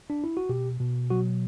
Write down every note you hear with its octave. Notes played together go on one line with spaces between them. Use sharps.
D4
E4
F#4
B2 G4
B2
F#3 F#4